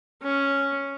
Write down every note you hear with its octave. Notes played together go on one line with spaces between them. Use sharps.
C#4